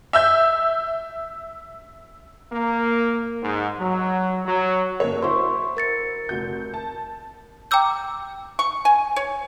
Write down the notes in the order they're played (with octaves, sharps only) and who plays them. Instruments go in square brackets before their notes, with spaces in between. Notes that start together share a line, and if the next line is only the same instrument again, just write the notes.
[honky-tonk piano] E5 E6 G6
[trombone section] A#3
G#2
F#3
F#3
[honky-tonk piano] F#1 C#5 [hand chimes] A#4
[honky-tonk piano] E4 F#4 C5 [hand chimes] C6 C#6
[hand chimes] A#4 A6 C#7
[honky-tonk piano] F1 F#4 G6
A5
[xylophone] G5 A#5 D6 E6 G6
[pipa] C#6
G#5
C#5